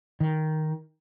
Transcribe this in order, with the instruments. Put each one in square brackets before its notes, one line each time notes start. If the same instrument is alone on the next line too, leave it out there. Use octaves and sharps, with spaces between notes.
[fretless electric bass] D#3